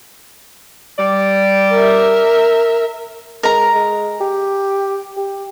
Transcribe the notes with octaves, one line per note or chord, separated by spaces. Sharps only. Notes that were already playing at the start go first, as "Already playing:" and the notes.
G3 D5
A#4 E5
G#3 A#4 A#5
G#3
G4
G4